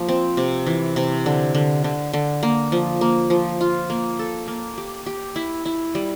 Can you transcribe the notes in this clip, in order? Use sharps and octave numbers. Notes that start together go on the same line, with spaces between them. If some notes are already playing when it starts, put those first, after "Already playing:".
Already playing: F3 A#3
C4
C3
E3
C3
D3
D3
D3
D3
A#3
F3
A#3
F3
F4
A#3
A4
A#3
G4
G4
E4
E4
G3